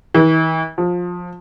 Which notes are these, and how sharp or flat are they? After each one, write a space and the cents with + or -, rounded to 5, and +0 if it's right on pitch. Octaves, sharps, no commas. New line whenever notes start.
E3 -45
F3 +20